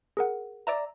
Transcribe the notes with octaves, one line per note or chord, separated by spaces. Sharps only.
G#4 A#4 F#5
D5 E5 A#5